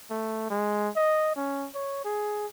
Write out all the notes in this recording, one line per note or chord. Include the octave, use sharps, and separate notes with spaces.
A3
G#3
D#5
C#4
C#5
G#4